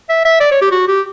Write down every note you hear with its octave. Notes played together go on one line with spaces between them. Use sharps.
E5
E5
D5
C#5
G4
F#4
G4